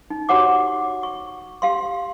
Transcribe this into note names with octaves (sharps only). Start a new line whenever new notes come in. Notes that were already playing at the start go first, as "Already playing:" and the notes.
D#4
F#4 G4 C#5 F#5 D6
C#6
G4 F5 C6